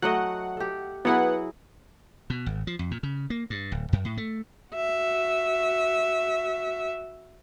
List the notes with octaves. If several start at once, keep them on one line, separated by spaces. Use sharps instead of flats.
F#3 A3 D#5 F#5
G4 A4
F#3 B3 E4 G#4 F#5
B2
G#1
F3
F2
A#2
C#3
A#3
G2
D1
F#2
A2
A3
F#4 E5